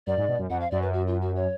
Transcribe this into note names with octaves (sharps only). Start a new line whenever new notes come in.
F#2 D5
G#2
B2
F#2
F2 F#5
F5
F#2 D5
B4
F#4
F4
F#4
C#5